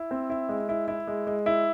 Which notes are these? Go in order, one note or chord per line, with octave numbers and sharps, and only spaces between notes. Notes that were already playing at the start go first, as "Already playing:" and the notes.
Already playing: E4
C4
E4
G#3
E4
E4
G#3
G#3
E4